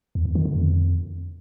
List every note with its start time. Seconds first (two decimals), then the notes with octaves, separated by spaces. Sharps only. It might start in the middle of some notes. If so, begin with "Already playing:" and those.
0.15 E2
0.25 E2
0.35 D#3
0.45 D3
0.55 F2